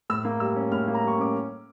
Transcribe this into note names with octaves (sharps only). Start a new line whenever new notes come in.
A2 E6
A#3
G3 E6
C#4
A2 F6
A#3
A#5
G3 C#6
C#4 D6